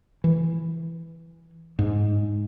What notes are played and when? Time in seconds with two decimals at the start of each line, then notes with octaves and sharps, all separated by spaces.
0.24 E3
1.79 G#2